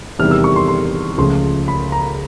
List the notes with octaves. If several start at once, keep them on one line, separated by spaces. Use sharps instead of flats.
E2 C3 D#3 G3 F6
E6
C#6
C6
C6
C#2 C#3 F3 A3 C6
B5
A#5